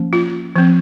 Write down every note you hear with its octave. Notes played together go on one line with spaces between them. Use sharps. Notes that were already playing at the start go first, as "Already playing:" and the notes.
Already playing: F3 A#3 C#4
F4
F3 C4